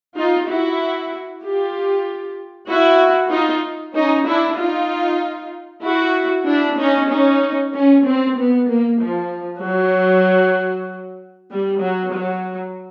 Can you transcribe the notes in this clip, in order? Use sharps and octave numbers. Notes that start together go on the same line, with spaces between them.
D#4 F4
E4 F#4
F4 G4
E4 F#4
D#4 F4
C#4 D#4
D4 E4
D#4 F4
E4 F#4
D4 E4
C#4 D#4
C#4 D#4
C#4
C4
B3
A#3
F3
F#3
G3
F#3
F#3